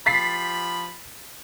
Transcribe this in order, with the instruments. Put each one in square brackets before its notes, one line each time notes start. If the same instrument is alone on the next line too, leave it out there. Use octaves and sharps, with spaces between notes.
[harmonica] F3 G4 B5 [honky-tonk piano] A6 B6 C7